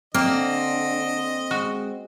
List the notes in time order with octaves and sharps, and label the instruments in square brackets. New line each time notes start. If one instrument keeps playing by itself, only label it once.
[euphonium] D3 [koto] A#3 [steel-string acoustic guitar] C4 [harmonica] D#5
[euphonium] G#3 [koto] F#4